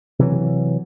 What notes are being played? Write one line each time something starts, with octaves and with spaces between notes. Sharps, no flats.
C3 E3 F#3